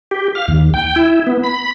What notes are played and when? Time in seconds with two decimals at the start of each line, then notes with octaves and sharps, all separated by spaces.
0.11 G4
0.35 F5
0.48 D#2
0.74 G5
0.96 E4
1.27 B3
1.43 B5